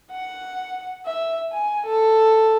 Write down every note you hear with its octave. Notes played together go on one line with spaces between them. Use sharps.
F#5
E5
G#5
A4